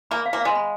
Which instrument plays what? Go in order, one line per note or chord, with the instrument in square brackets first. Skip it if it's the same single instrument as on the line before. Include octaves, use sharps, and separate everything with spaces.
[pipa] A#3 [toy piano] B5
[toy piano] F5
[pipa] A#3
[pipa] G#3 [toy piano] F5
[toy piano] B5